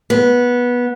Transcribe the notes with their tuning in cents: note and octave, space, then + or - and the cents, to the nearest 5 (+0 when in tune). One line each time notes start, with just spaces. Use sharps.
B3 -15